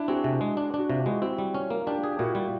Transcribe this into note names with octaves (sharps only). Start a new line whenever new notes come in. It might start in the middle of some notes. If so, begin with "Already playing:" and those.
Already playing: D4 E4
C4 F#4 G#4
C3
G#3
D4
D4
F#4
C3 F4 G4
G#3 E4 F#4
C4 E4 F#4
G3
C#4
A#3
D4 F4 G4
G#4
G4
A#2 E4 F#4
G3 F4 G4